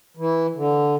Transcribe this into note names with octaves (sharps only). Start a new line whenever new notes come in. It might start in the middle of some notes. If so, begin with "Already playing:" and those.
E3
D3